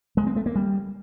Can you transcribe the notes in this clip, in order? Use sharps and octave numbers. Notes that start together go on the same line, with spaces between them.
G#3
C4
A3
A#3
G3